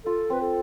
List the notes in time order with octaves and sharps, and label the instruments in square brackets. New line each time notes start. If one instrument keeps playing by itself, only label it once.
[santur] F4 [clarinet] A4
[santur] C4 [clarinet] B4
[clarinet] A4